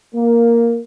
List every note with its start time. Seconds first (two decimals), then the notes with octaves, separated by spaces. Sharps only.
0.15 A#3